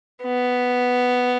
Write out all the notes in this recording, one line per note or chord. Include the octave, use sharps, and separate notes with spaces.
B3